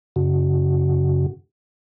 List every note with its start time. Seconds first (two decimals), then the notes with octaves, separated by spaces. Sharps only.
0.16 F#2 C#3 F#4